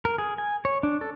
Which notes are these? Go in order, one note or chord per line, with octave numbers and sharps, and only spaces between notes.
A#4
G#4
G#5
C#5
D4
A4